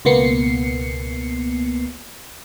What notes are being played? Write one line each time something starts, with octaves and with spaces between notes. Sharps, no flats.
C#2 B2 A#3 B3 C7 C#7